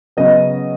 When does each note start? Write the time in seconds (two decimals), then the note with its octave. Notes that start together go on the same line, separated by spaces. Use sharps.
0.17 C#3 F#3 B3 D#5